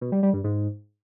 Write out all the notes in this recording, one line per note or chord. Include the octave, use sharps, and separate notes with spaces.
B2
G3
G3
G2
G#2